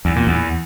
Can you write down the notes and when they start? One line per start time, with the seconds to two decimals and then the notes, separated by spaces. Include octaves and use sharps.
0.05 E2
0.16 A#2
0.27 E2